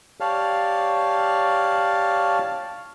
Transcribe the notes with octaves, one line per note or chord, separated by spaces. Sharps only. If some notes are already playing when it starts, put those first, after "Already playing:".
G4 C#5 D5 F5 A5 F6